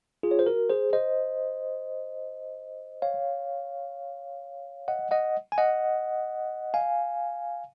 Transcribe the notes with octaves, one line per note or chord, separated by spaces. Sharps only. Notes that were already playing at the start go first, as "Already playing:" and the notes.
F4 G#4
C#5
C5
F#4 A#4
G#4 C5
C5 D#5
C#5 F5
D#5 F#5
D#5 F#5
G#5
D#5 F#5
F5 G#5